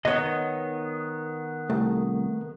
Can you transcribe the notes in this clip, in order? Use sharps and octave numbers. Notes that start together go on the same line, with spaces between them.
D#3 B3 C#5 D#5
C2 A3